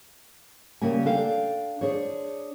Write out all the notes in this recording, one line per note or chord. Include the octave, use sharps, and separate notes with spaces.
C#3 G3 A#3 G4 G#5
D4 A4 F5 G5
D4 G#4 C5 C#5